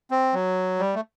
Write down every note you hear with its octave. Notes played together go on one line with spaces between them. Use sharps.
C4
F#3
G3
A3